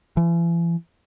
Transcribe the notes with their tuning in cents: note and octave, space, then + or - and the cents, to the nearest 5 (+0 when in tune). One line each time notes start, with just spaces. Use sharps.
E3 +40